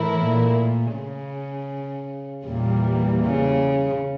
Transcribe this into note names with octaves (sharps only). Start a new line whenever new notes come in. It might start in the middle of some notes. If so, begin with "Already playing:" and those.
Already playing: A2 E3 A3 E4 A#4
A#2
C#3
E2 A#2 E3 G3 A#3
C#3